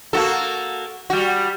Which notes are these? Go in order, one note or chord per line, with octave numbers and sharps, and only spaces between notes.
A#3 F#4 A4
G3 F#4